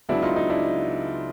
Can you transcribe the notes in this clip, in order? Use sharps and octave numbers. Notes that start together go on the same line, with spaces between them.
C#2 C#3 F#3 B3 D4 E4
D#4 F4
D#4
D4 E4